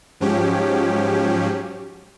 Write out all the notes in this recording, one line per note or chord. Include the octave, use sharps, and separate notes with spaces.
G#2 F3 F#3 C#4 G4